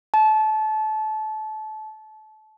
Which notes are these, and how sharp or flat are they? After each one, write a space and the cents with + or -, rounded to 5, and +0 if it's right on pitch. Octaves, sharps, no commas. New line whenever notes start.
A5 -25